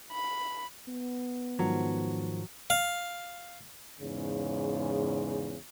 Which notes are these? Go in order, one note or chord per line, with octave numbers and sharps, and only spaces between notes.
B5
B3
G#2 D#3 F3 F#3
F5
E2 G#2 C#3